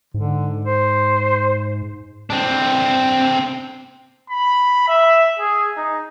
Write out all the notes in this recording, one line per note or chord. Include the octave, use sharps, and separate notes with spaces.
G#2 D3
C5
C4 D4
B5
E5
G#4
D#4